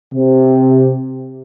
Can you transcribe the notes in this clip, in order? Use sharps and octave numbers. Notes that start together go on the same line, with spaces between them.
C3